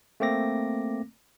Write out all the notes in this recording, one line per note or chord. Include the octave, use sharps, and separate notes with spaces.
A3 A#3 C4 D6 A#6